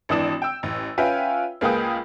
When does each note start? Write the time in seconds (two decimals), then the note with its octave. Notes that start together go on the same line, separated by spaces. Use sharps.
0.09 G#1 E3 D4 D#6 E7
0.42 G5 E6
0.63 A1
0.98 C#4 F4 B4 E5 G5 G#5
1.61 C#2 A#3 G#4 B4 G5 D#6